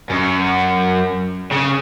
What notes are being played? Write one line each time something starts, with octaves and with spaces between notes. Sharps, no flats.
F#2
C#3